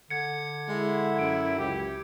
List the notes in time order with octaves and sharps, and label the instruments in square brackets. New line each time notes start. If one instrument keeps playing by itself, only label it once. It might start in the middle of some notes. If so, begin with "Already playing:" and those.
[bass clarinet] D3 [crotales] G#6 C#7
[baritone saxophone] G#3 [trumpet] E4
[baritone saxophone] F#2 [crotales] D7
[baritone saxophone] C#2 [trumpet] G4